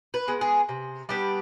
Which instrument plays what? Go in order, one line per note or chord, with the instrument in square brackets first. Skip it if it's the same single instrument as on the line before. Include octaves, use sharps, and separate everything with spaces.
[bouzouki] B4
G#3 B3
G#4
C3
G3 B3 D4 G4